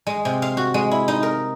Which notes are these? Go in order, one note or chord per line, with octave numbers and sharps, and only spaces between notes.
G#3
C3
F5
F#4
G#3
E4
D#4
A#4